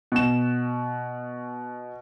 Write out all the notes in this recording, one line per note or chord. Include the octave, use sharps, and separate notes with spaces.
B2 E7